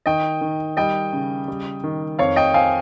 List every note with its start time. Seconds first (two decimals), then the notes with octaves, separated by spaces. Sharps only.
0.06 D#3 D#5 G5
0.41 D#3
0.77 G3 D#5 G5
1.13 C#3
1.48 G3
1.83 D#3
2.19 F2 C#5 F5
2.36 D#5 G5
2.54 F2 F5 G#5